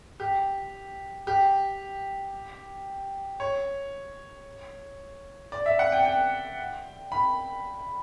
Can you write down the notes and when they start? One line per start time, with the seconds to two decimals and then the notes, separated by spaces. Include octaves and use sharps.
0.20 G4
1.27 G4
3.40 C#5
5.52 D5
5.66 E5
5.79 F#5
5.92 G5
6.05 G5
7.12 B5